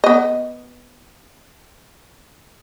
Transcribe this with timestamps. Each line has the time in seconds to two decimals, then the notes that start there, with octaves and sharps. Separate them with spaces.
0.04 B3 D#5